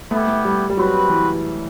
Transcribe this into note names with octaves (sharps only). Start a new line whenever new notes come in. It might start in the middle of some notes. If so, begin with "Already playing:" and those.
A3 B3 E4 G4
A3
G3
G3
F#3 C4 F#4 B4
E3